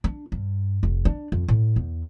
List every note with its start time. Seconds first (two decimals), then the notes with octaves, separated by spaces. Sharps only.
0.04 D4
0.32 G2
0.83 F1
1.05 D4
1.32 F2
1.48 A2
1.76 E2